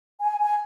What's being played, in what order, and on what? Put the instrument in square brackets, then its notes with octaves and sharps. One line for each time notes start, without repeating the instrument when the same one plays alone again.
[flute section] G#5
G#5